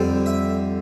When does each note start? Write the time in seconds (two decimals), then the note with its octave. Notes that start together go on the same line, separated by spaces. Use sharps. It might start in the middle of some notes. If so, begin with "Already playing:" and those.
Already playing: F2 D3 G3
0.26 E5